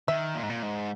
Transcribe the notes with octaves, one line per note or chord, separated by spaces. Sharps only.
D#3 E5
A#2
G#2
A#2
G#2